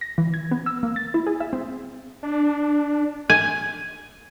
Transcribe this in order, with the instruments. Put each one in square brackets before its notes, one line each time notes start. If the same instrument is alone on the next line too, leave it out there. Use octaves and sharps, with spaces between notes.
[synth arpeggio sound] A#6
E3
G#6
B3
E6
A#3
A6
E4
G#4
E5
C4
[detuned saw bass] D4
[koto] G#5